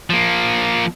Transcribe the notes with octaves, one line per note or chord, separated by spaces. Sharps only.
F3 A#3